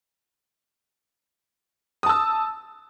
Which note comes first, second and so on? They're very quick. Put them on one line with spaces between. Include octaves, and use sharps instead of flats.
D#6 A5 E6